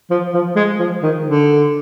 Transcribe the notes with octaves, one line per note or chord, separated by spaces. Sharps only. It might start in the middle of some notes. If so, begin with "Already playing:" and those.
F3
F3
G#3
F3
D#3
D3